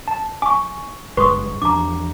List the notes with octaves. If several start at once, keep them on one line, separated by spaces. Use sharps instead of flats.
A5
G#5 C#6 D6
F#1 G2 G#3 B4 C6 C#6 D#6
E2 F3 D4 A#5 D6